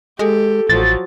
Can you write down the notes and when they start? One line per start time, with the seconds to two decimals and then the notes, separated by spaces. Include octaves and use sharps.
0.19 G#3 G4 A4
0.69 A1 F3 F#3 A6